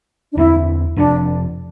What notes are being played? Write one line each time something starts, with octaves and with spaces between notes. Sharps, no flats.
D4
E2 D3 A3 C4 E4
F1 F2 C3 D4